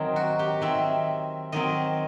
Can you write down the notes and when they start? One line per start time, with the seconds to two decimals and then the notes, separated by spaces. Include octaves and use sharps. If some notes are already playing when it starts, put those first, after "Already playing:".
Already playing: D#3 F#3 C4 D#4
0.16 F#4
0.39 G4
0.61 D#3 F#3 C4 E5
1.52 D#3 F#3 C4 D#5